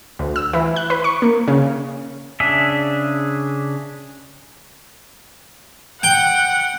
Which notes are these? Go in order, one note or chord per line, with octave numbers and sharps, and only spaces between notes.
D2
E6
E3
F#6
B4
C#6
A#3
C#3
C#3 D4 G#4 E5
F#5 G5